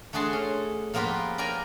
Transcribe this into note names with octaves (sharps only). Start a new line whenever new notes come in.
A3 D4 F#4 G#4 A5 C6
C#4
F3 A#3 B3 F4 G4 B4
A#4 D5 G5 G#5 A#5